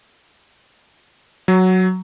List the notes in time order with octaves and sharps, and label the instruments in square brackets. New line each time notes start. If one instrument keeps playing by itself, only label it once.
[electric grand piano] F#3